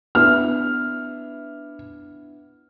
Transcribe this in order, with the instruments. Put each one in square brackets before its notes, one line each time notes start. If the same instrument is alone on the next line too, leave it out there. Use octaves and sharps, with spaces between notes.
[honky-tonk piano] B3 D4 E4 [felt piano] F6